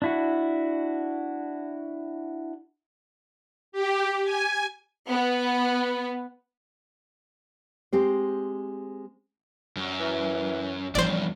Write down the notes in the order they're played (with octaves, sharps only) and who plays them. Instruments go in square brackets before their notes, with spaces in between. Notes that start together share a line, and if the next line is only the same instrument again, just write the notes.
[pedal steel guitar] D4 E4 F#4
[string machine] G4
G#5
[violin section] B3
[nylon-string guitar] G#3 C4 G4 C5
[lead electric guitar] F#2
[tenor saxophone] E3
[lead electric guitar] E2 G2 [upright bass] F3 E4 [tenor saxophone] C#4 [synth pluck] C5 D5